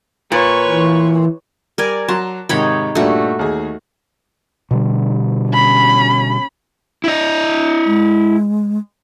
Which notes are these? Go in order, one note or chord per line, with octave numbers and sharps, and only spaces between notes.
A#2 B4 C#5 C#6
E3
G3 A#4 D5 G#5
F#3 A5 A#5 C6
G#2 C3 D#3 D#4 C#5 B5
G2 A#2 G3 A3 F#4
D#2 G#4
B2 D3 G3
C#4 B5
E4 D#5
G#3